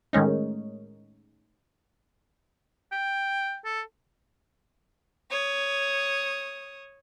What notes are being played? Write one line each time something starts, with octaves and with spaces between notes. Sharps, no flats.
A2 D#3 G#3 C#4 D#4
G5
A4
C#5 D#6